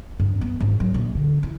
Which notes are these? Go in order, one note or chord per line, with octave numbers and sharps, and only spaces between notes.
G2
B3
G#1
F#3
A#1
D3
E4